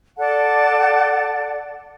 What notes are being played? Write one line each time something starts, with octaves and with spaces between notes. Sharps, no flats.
A4 D5 F#5 A5